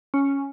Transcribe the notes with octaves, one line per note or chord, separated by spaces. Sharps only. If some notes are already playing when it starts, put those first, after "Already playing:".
C#4